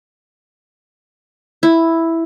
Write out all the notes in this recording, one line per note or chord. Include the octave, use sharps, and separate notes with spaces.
E4